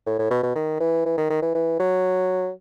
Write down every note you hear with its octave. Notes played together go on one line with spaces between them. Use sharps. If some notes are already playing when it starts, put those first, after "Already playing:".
A2
A2
B2
B2
D#3
E3
E3
D#3
D#3
E3
E3
F#3